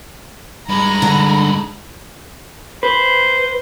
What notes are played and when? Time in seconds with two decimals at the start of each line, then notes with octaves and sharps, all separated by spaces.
0.69 G2 G#3 A#5 B5
1.02 D3
2.83 B4 C5